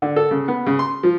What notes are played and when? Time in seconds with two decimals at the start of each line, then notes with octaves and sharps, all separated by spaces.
0.02 D3
0.16 A4
0.31 C#3
0.48 B3
0.66 C#3
0.79 C6
1.03 F3